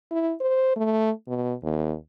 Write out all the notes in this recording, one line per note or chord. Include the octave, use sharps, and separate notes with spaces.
E4
C5
A3
B2
D#2